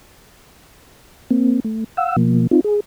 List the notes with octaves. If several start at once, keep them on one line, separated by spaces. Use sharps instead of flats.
A#3 C4
A3
F5 F#5 E6
B2 F3 A#3
C4 D#4 F4
G#4